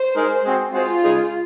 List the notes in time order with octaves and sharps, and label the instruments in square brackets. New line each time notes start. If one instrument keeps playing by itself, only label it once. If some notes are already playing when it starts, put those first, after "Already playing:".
Already playing: [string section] C5
[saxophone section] G#3 D#4 A#4
G#3 C4 F#4 C5
[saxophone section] G#3 C4 F#4 C5 [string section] F4
[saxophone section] C#3 G#3 D#4 G#4